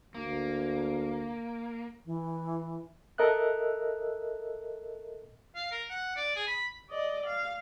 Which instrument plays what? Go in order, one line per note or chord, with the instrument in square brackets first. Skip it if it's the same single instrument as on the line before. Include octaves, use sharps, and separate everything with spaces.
[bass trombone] D2 [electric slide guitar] A#3
[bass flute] E3
[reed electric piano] A4 A#4 D#5 E5 F#6
[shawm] F5
A#4
F#5
D5
G#4
B5
[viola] D5 D#5
F5